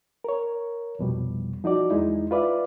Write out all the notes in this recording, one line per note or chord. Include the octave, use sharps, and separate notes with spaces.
A#4 C#5
C2 F2 B2 F3 G3
F3 D#4 F#4 D5
E2 G#3 D#4 E4
F4 B4 D5 E5 F5